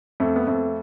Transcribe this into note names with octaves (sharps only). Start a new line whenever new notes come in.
F2 A3
B3
F2 A3